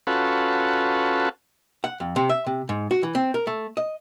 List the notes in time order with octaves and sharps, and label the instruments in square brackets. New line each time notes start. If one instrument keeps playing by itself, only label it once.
[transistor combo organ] C#4 F4 F#4 A4 B4
[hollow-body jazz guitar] F#5
F2
C3
E5
C3
G#2
F#4
E3
C4
A#4
A3
D#5